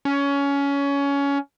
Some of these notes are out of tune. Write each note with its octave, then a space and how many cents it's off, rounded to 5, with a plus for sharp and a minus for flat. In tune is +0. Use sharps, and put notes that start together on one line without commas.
C#4 +20